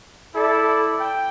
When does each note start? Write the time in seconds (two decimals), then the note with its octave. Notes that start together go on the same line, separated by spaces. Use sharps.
0.33 E4 A4 D5
1.01 G5